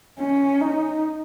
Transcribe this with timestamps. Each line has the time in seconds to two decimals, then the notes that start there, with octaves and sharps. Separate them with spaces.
0.19 C#4
0.61 D#4